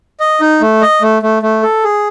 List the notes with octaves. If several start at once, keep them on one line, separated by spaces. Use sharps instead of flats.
D#5
D#4
A3
D#5
A3
A3
A3
A4
G#4